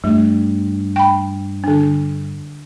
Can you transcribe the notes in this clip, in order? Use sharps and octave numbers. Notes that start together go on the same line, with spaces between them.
G2 A3
G5 B5
D3 D4